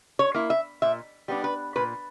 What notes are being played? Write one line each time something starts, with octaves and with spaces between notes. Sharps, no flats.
C#5
A#3 E4
E5
A#2 E5
G3 B3 D4
B4
A#2 B4